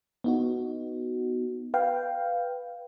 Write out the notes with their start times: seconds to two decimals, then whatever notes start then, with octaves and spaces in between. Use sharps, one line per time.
0.24 B3 D#4 F#4
1.74 B4 F5 G5